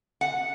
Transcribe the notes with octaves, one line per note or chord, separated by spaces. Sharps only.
F#5